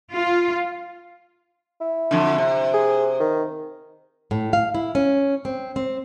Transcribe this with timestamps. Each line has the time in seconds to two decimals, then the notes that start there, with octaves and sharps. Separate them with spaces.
0.14 F4
1.81 E4
2.11 F2 D3
2.38 C3
2.74 G#4
3.20 D#3
4.31 A2
4.53 F5
4.74 E4
4.95 C#4
5.45 C4
5.76 C4